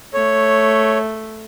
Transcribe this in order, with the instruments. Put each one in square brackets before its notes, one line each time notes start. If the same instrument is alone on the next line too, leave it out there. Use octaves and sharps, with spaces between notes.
[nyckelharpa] A3 [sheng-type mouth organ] C#5